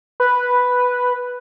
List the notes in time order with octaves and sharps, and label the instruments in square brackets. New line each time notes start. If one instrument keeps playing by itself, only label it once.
[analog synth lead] B4